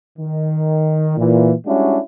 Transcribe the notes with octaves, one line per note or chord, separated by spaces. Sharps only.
D#3
A#2 E3
G3 G#3 C#4 D4 E4 F#4